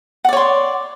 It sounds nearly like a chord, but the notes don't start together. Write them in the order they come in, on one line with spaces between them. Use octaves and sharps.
F#5 D5 C#5 C6